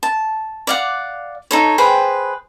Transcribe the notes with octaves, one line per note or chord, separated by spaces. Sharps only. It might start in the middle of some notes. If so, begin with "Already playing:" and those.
A5
D5 F5 F#5
D#4 A4 C#5
G#4 B4 C5 G5